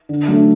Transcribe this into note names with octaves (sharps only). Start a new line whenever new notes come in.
D3
F#3 A3 D4